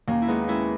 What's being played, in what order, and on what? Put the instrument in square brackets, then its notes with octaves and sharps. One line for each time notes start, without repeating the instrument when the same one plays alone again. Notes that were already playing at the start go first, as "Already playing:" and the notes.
[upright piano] D#2 [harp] A#3 C#4
[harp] E4
[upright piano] G#3 [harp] B3 D#4
[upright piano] G#3 [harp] C#4 E4